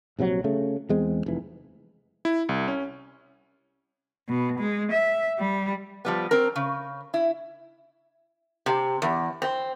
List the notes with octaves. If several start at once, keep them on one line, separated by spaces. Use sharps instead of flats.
A#1 C3 D#3 F#3
C#3 A3
E2 G#3 C4
F1 E3
E4
C2
C#4
B2
G#3
E5
G3
F3 G3 B3
C4 A#4
C#3
E4
C3
E2
C4